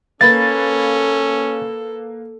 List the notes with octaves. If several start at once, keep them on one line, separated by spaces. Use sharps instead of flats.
A#3 C#4 A4 B4 A6